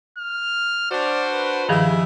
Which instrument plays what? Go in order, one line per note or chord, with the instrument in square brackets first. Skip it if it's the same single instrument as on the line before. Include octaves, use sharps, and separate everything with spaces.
[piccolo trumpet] F6
[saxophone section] D4 F#4 C5 [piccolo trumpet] D5
[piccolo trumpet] B4
[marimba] G2 D#3 F3 [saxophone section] E4 G#4